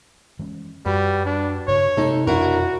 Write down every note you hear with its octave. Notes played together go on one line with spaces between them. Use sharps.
E3 G#3 C#4
F#2 G3 F#4 B4
D4
G2 C#3 C#5
C3 G#3 A#3 D#4 A4
F2 B2 D4 E4 F#4 A#4